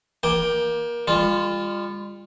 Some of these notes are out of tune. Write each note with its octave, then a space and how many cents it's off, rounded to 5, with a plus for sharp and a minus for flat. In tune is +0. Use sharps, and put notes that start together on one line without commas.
A#3 +25 G5 +0
G3 +45 F4 +0